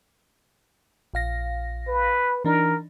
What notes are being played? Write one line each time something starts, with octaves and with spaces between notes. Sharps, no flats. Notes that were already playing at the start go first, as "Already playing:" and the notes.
A#1 F5 A#6
B4
E3 D4 D#4 A#4